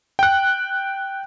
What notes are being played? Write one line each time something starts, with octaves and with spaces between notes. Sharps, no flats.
G5 F#6